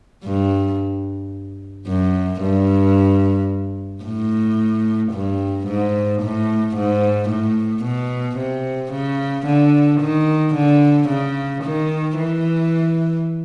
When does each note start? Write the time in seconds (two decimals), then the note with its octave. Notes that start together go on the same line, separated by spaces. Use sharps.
0.25 G2
1.88 F#2
2.42 G2
4.04 A2
5.13 G2
5.67 G#2
6.22 A2
6.76 G#2
7.29 A2
7.84 B2
8.38 C3
8.93 C#3
9.46 D3
10.01 D#3
10.55 D3
11.09 C#3
11.64 D#3
12.18 E3